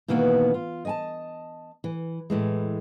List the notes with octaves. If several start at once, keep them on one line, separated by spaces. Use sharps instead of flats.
B2 D#3 E3 A#3 B3 F#4
F4
D#5 G#5 A5
E3
A2 E3 G#3